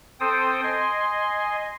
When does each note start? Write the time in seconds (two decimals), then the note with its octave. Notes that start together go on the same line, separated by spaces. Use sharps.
0.20 C4 A4 C5 G5 D#6
0.63 D#5 G#5 C6